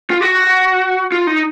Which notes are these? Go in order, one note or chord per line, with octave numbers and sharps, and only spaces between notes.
F4
F#4
F4
D#4